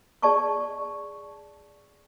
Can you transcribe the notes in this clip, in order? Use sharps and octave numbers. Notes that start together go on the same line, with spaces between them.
G#4 D5 A5 C#6